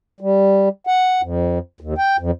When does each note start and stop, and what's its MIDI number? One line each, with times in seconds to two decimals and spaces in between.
0.21 0.69 55
0.87 1.21 78
1.22 1.59 41
1.81 1.94 39
1.98 2.17 79
2.19 2.31 41